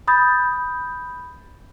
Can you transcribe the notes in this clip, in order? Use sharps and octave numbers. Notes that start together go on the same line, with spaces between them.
B5 D#6 G6 A6